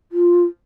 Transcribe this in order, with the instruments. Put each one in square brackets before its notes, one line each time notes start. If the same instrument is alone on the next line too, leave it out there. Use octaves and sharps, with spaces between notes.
[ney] F4